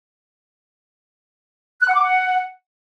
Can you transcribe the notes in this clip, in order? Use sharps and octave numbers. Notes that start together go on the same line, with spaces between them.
F#6
F#5
D6
F#5